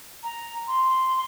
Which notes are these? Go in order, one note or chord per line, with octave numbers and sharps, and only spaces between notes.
A#5
C6